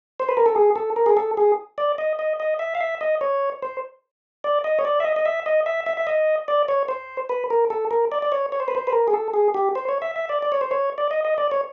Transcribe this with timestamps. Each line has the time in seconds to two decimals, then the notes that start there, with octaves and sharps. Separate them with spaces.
0.20 C5
0.29 B4
0.37 A#4
0.46 A4
0.56 G#4
0.76 A4
0.96 A#4
1.06 G#4
1.17 A4
1.37 G#4
1.78 D5
1.98 D#5
2.19 D#5
2.40 D#5
2.59 E5
2.75 F5
2.81 E5
3.01 D#5
3.21 C#5
3.62 C5
4.44 D5
4.64 D#5
4.79 C#5
4.85 D5
5.00 E5
5.04 D#5
5.16 D#5
5.25 E5
5.46 D#5
5.66 E5
5.86 E5
5.97 E5
6.07 D#5
6.48 D5
6.68 C#5
6.88 C5
7.29 B4
7.50 A#4
7.70 A4
7.91 A#4
8.12 D5
8.22 D5
8.32 C#5
8.52 C#5
8.60 C5
8.68 B4
8.75 C5
8.87 B4
8.93 A#4
9.08 G#4
9.13 A4
9.34 G#4
9.54 G4
9.75 C5
9.89 C#5
10.02 E5
10.16 E5
10.29 D5
10.42 D5
10.52 C#5
10.61 C5
10.71 C#5
10.98 D5
11.11 D#5
11.25 D#5
11.38 D5
11.51 C#5